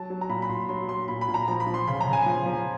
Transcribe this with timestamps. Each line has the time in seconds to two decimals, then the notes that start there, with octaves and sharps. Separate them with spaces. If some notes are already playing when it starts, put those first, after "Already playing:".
Already playing: F#3 A5
0.10 F#3
0.21 A#5
0.29 A#2 B5
0.42 B5
0.49 A#2 C6
0.69 F#3 C6
0.89 F#3 C6
1.08 A#2 B5
1.21 B5
1.28 A#2
1.34 A#5
1.48 F3 A#5
1.60 B5
1.67 F3
1.74 C6
1.87 C#3 B5
2.01 A#5
2.07 C#3
2.13 G#5
2.26 F3
2.46 F3